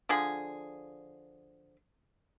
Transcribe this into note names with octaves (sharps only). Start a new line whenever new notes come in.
D3 F3 G#4